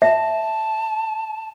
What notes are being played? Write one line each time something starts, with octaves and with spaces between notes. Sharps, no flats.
E5 A5